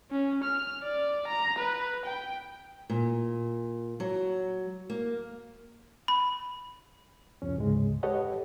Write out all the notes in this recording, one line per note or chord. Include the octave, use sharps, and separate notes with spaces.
C#4
F6
D5
A#5
B4
G5
A#2
F#3
A#3
B5
C2 F2 C#4
D2 G#2 C#3 G#3
G4 A4 B4 C#5 D#5 F#5